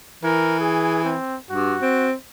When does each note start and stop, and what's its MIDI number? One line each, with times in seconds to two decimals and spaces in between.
0.23 1.15 52
0.23 0.60 70
0.60 1.03 68
1.05 1.37 60
1.50 1.75 43
1.50 2.08 66
1.81 2.13 60